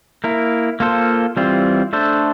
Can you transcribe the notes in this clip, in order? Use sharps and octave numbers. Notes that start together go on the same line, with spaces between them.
A#3 E4 A#4
A#3 F4 A4 C5
E3 G3 C4 F4
A3 D4 A4 C5